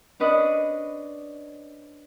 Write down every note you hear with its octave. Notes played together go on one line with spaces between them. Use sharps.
C#4 D4 B4 D#5